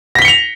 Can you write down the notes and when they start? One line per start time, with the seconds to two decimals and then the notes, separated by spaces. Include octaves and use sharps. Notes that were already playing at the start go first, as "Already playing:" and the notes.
0.15 A#6
0.19 B6
0.22 G7
0.25 C#7
0.28 F7